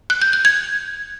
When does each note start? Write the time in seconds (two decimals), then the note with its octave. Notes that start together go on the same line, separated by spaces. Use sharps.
0.10 F#6
0.22 G6
0.33 G6
0.45 G#6